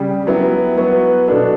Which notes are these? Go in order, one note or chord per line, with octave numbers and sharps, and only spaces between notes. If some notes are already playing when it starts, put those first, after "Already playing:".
Already playing: C#3 G3
F#3 B3 E4
F#3 B3 F#4 B4
B2 F#3 B3 D4 A4